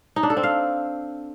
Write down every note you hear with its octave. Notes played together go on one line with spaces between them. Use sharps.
D#4
D4
A4
C4
F5